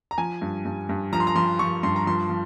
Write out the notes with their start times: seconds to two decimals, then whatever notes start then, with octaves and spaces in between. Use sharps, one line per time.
0.11 A#5
0.18 F3 G#5
0.42 G2
0.65 G2
0.89 G2
1.13 F3 A#5
1.20 C6
1.27 A#5
1.36 F3 C6
1.59 F3 C#6
1.83 G2 C6
1.96 A#5
2.07 F3 C6
2.30 F3